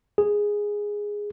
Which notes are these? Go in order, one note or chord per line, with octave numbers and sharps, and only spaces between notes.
G#4